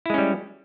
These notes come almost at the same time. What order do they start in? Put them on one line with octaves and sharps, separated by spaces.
E4 G#3 C#4 G3